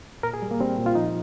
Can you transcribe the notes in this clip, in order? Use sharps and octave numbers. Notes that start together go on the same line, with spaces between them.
A#2 A#4
G#4
G3
A#3
G3 C4
A#2
F4
F3 D#4